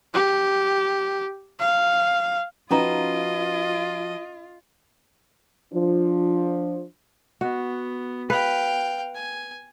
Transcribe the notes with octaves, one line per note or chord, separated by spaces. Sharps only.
G4
F5
F3 C#4 D#4 F4 F#4 B4 D#5 A#5
F3 D4
B3 F#4
B4 F5 G5
G#5